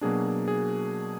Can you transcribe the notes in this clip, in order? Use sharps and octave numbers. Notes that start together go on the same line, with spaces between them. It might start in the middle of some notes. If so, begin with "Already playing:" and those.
B2 F#3 A#3 D4 G#4
G#4
G#4